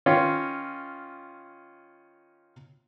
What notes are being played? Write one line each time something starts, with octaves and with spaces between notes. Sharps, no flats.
D#3 C#4 F4